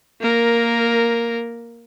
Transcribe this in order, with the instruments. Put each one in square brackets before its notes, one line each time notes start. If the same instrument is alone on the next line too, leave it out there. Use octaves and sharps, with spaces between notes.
[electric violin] A#3 A#4